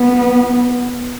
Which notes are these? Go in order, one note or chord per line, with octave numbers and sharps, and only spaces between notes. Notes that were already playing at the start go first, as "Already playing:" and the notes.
Already playing: B3